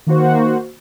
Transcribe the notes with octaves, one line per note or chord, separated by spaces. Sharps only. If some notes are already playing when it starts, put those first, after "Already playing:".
D#3 A#3 F#4 C5